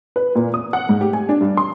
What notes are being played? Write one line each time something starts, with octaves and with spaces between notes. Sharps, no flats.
B4
A#2
D#6
F#5
G#2
G4
G#5
D4
G2
C6